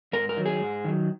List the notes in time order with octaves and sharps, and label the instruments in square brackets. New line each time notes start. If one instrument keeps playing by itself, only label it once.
[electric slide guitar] G#2 A#4
A#4
D#3 F#3
G#4
G#2
D#3 F#3